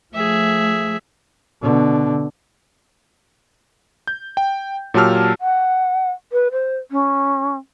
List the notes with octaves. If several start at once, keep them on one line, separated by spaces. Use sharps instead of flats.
F3 A3 G#4 E5
B2 D3
G6
G5
A#2 F#3 G4 A5 E6 F6
F#5
B4
C5
C#4